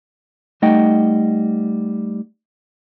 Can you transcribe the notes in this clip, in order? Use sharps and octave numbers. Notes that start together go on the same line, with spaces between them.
G3 A3 D#4 D#5 F#5 G5